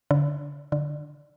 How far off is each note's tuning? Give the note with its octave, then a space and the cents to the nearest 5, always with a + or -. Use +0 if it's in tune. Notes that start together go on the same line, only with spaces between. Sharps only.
D3 -25
D3 +5